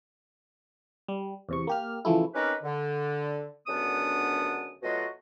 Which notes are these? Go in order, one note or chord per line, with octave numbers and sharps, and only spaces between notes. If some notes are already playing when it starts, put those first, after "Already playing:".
G3
E2 C3 C#6
A#3 G4 F6
C#3 E3 F3 A3 E4
C4 C#4 D#4 G4 A#4 B4
D3
C#2 F#2 D3 B3 D4 D#6
B2 F#3 A3 F4 F#4 D#5